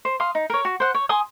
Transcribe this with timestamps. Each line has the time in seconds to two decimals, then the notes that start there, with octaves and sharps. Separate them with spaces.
0.05 C5
0.20 F5 C6 D#6
0.35 D#4
0.50 A#4 C#5
0.65 F#4
0.80 C5 F#5
0.94 C#5
1.09 G#5 C6 D#6